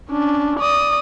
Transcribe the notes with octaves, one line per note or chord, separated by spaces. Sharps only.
C#4 D4
D5 D#6